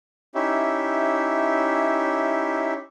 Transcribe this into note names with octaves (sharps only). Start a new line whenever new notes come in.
C#4 D#4 E4 G4 E5